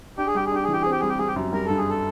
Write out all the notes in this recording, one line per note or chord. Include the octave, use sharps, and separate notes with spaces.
D4 G4
G#4
G3 G4
G#4
D4 G4
G#4
E3 G4
G#4
C4
G4
G3 G#4
G4
G3 G#4
G4
F#2
G3 A#4
G2 A4
G#4
A4